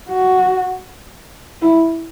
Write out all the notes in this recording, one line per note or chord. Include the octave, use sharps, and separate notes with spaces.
F#4
E4